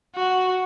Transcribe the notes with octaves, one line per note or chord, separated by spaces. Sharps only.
F#4